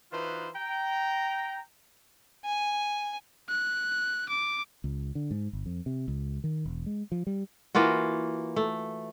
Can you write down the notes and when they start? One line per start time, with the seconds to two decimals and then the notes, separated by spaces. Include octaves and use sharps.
0.12 E3 D#4 F4 F#4 B4 C5
0.55 G5 A#5
2.45 G#5
3.49 F#6
4.29 D6
4.84 C#2
5.15 D3
5.31 G#2
5.53 G1
5.66 F2
5.86 C3
6.08 C#2
6.44 D#3
6.66 E1
6.86 G#3
7.12 F3
7.27 G3
7.75 E3 A#3 F4 F#4
8.56 A3